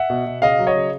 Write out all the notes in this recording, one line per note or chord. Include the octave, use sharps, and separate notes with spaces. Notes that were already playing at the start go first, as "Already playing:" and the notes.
Already playing: E5 F#5
B2
B2
C#3 D#5 F5
F#3
C#5 D#5
C#3